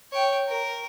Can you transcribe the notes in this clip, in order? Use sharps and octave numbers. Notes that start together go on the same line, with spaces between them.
C#5 G5
A#4